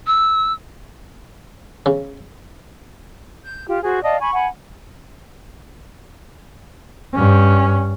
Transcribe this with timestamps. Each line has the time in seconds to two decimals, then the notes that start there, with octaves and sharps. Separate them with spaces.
0.07 E6
1.86 C#3
3.43 G6
3.67 F4 G4
3.83 F#4 G#4 C5
4.03 D5 D#5 F5 A5
4.20 G#5 B5 C#6
4.33 F#5 G#5 B5
7.15 G2 C#4